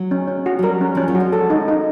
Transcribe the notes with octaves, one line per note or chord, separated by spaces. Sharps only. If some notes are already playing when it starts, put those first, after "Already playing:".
Already playing: F#3
C#4
C#4
F#4
F#3
G3 A#4
C#4
F3 C#4
F#3
F#4
G3
G#3 A4
D#4
D#4